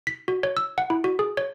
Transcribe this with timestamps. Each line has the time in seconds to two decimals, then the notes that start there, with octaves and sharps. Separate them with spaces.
0.07 B6
0.28 F#4
0.43 C#5
0.57 E6
0.78 F#5
0.90 E4
1.04 F#4
1.19 G#4
1.37 C#5